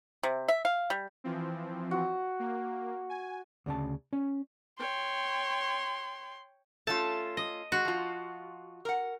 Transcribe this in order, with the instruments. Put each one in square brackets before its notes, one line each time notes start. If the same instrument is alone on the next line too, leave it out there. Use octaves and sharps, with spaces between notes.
[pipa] C3
E5
F5
G3
[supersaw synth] E3 F3 C4
[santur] F#4
[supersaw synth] A#3
G#5
[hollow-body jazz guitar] D2 C#3 A5
C#4
[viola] C#5 G5 [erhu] C6
[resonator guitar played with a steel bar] A3 C#4 F4 [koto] A5
[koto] D#5
[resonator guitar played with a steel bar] G#3 [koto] F#4
[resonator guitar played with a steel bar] F3 F4
A#4 F#5